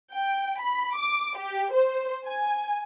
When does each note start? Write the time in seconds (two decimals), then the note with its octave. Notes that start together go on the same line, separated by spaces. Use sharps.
0.13 G5
0.61 B5
0.96 D6
1.38 G4
1.74 C5
2.26 G#5